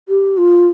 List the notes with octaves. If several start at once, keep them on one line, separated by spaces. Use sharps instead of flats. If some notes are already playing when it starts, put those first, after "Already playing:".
G4
F4